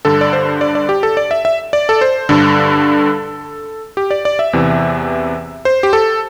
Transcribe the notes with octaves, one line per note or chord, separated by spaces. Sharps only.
G2 D3 A4
D5
C5
D5
D5
G4
A4
D5
E5
E5
D5
A4
C5
G2 D3 A4
G4
D5
D5
E5
E2 C3 E3
C5
G4
A4